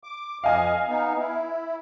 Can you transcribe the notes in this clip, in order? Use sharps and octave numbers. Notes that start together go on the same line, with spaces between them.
D6
F2 D#5 F5 G#5
B3 D#4
E4